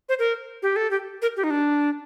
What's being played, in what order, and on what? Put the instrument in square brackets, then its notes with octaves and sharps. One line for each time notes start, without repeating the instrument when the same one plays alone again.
[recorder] C5
A#4
G4
A4
G4
A#4
G4
D#4
D4